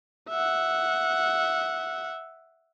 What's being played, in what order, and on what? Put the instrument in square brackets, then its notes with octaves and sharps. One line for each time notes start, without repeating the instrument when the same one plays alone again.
[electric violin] E5 F#5